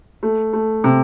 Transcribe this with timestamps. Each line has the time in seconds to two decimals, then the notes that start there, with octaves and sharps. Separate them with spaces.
0.23 A3
0.53 A3
0.84 C3